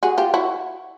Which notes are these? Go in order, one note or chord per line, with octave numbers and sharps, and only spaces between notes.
F#4 G#4
F4 G4
E4 F#4